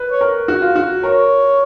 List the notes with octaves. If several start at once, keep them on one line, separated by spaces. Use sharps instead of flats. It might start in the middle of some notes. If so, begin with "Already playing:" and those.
Already playing: B4
C#5
A#4
F#4
F4
F#4
A#4 C#5